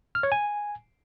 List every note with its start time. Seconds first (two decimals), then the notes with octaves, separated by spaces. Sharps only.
0.15 F6
0.23 C#5
0.32 G#5